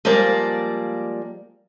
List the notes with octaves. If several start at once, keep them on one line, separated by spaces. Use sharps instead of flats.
F3 G3 G#3 A#3 D5